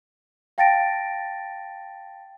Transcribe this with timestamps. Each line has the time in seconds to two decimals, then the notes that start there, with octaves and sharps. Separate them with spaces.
0.58 F5 G5 A5 A6 A#6 D7